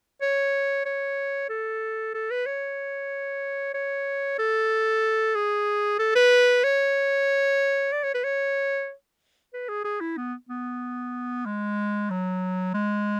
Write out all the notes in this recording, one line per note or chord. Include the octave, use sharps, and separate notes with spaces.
C#5
C#5
A4
A4
B4
C#5
C#5
A4
G#4
A4
B4
C#5
D5
C#5
B4
C#5
B4
G#4
G#4
E4
B3
B3
G#3
F#3
G#3